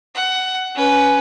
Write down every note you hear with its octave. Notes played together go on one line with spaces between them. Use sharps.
F#5
C#4 B4